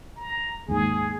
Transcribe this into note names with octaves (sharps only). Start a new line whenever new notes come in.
A#5
D#2 G#2 G#4